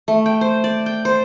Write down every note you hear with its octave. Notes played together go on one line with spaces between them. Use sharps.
A3
G5
C5
D5
G5
C5